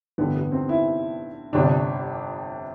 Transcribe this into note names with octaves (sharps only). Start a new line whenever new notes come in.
A1 G2 D3 B3
B3
C4
E4
G1 F2 C3 D4